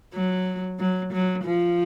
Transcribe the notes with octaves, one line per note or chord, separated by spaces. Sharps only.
F#3
F#3
F#3
F3